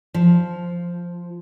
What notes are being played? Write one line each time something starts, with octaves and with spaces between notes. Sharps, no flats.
F3